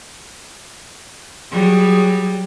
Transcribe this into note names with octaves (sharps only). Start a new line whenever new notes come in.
F#3 G3 G#4